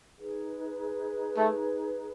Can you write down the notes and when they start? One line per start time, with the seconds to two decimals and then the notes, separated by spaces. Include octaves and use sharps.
0.17 D#4 G#4 B4
1.37 A3